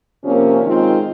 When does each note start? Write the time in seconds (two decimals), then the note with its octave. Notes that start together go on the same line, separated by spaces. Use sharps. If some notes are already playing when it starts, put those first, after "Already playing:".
0.24 C3 F3 A#3 C#4
0.61 D#3 G#3 C4 F4